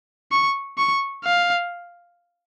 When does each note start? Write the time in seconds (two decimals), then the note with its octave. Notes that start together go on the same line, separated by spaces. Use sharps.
0.32 C#6
0.78 C#6
1.24 F5